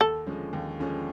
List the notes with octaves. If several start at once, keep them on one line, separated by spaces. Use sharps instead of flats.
D#2 A4
D3 F3 G#3 C#4
D#2
D3 F3 G#3 C#4